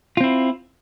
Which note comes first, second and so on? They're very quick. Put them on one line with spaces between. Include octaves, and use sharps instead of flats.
F4 C4 E4